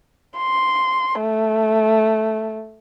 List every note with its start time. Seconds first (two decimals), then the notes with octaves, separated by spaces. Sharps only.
0.38 C6
1.21 A3